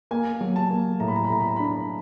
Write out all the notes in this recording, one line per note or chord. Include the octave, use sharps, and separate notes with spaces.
A#3 G#5
F#3
A5
A#3
A2 A#5
B5
A#5
B5
A2 A#5
B5
A#5
D4 B5
A#5